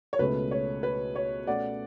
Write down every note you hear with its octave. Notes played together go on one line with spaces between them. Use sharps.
C#5
C#2 B2 A3 C#4 B4
C#5
B4
C#5
B2 A3 C#4 D5 F#5